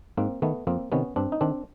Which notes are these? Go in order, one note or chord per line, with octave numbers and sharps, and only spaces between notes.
G#2 A#3 C4
D#3 A3 B3
F2 A#3 C4
C3 D#3 B3 C#4
G2 C4 D4
D#4
D#3 C4 D4